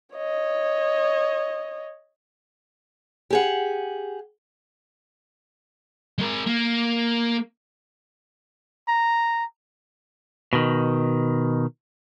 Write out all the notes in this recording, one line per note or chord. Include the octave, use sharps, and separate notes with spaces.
C#5 D#5
G4 G#4 F#5
G#3 A#4
A#3
A#5
B2 D#3